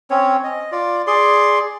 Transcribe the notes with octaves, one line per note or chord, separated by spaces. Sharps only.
C4 C#4 C#5
D#5
F4 D5
G#4 D5 C6